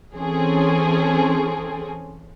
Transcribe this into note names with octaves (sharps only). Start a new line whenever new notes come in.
E3 C4 C#4 G#4 A4